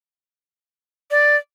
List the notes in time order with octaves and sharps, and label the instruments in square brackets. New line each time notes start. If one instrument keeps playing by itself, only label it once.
[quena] D5